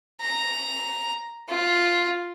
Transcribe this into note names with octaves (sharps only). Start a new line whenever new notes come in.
A#5
F4